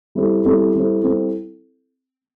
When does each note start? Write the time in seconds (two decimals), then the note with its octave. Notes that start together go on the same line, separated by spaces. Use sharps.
0.15 G3 C4 E4 A4 C5
0.45 G3 C4 E4 A4 C5
0.75 G3 C4 E4 A4 C5
1.03 G3 C4 E4 A4 C5